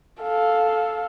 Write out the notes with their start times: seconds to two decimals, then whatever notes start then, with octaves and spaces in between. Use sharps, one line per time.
0.23 A4 F5